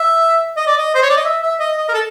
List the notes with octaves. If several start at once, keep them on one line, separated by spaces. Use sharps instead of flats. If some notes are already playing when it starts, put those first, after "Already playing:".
Already playing: E5
D#5
D5
D#5
C5
C#5
D5
D#5
E5
E5
D#5
D#5
A#4
A4